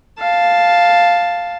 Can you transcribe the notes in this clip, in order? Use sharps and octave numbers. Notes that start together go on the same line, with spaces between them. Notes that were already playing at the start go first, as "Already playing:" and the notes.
F5 A5